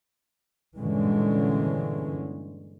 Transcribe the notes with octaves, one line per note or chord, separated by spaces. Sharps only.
G2 A#2 D3 E3 G#3 C#4